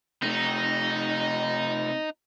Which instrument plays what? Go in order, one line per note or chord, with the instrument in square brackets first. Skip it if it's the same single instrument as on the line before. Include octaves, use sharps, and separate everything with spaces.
[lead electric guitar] C3 A3 [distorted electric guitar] D#4